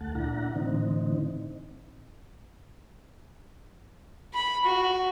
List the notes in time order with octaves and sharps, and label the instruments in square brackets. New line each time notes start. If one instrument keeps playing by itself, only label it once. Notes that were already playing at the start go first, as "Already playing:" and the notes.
[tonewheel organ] D2 A3 F#5 A5
A#2 D4 E4 F#5 A#5
A2 D3 E3 C4 D#4
[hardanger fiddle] B5
F#4